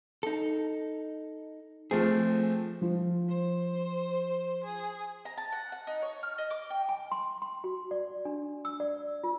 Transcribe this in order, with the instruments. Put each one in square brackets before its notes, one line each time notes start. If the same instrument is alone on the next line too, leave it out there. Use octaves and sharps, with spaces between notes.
[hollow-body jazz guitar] D#4 A4
[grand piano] F3 A3 C4 [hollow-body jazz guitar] G#4
[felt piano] F3
[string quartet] C5
G#4
[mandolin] A#5
A5
F#5
F#5
D#4
C#5
F6
D#5
D6
G5
[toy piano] G#5
C6
C6
F#4
D5
D4
E6
D5
F4